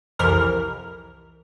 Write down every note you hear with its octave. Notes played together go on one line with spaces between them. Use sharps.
C2 F2 E3 A#4 F6